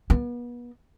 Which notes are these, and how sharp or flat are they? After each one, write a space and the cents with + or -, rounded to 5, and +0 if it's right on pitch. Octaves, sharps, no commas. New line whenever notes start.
B3 -35